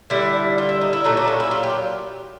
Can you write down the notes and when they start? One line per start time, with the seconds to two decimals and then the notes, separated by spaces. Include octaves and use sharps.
0.10 D3 G3 E4
0.58 F4
0.69 E4
0.81 D#4
0.93 E4
1.04 A#2 F#3 A3 D#4
1.17 D4
1.28 C#4
1.40 E4
1.51 F4
1.63 G4